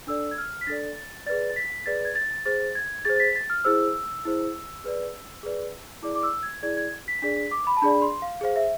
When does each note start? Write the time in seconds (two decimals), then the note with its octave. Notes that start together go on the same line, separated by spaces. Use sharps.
0.07 D4 A4 D5 E6
0.31 G#6
0.38 F6
0.61 B6
0.67 D4 A4 D5 A6
0.96 A6
1.26 G#4 B4 D5 A6
1.50 A6
1.56 B6
1.86 G#4 B4 D5 A6
2.05 G#6
2.15 A6
2.45 G#4 C5 A6
2.75 G#6
3.05 G#4 C5 A6
3.16 A6
3.20 B6
3.36 A6
3.50 F6
3.64 E4 G#4 C5 E6
4.25 E4 G#4 C5
4.84 G#4 B4 D5
5.43 G#4 B4 D5
6.03 E4 G#4 D5 D6
6.15 D6
6.23 E6
6.43 G#6
6.62 E4 G#4 D5 G#6
6.77 G#6
7.08 B6
7.22 D4 G#4 D5 B6
7.37 B6
7.51 D6
7.67 B5
7.77 A5
7.82 D4 G#4 D5 B5
8.02 C6
8.22 F5
8.41 G#4 C5 F5
8.56 E5